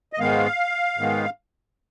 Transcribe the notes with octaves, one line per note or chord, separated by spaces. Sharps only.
D#5
G#2 D#3 G#3 B3 F5
G#2 D#3 G#3 B3